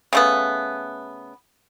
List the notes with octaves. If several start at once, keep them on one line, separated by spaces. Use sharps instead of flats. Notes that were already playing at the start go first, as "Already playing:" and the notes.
C#3 A3 B3